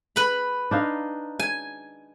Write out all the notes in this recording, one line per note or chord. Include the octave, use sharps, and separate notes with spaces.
B4 B5
D4 D#4 F5
G#5